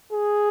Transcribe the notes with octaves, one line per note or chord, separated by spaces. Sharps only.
G#4